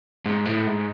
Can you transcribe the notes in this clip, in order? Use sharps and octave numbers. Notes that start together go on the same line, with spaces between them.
G#2
A2
G#2